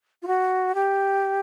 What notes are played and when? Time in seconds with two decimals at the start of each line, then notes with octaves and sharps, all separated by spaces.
0.22 F4
0.27 F#4
0.75 G4